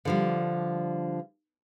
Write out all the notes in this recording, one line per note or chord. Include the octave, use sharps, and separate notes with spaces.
D3 F3 G3